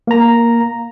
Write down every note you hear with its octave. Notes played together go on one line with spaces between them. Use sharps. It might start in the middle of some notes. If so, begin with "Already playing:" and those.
A#3 A#5